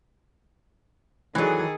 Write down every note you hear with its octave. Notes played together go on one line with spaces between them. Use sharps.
D#3 E3 F#3 G#4 A4